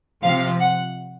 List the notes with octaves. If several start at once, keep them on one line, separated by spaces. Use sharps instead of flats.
C3 F3 F5
F#5